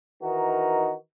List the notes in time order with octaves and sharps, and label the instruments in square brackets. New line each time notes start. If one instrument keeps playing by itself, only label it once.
[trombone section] D#3 E3 D#4 F#4 A#4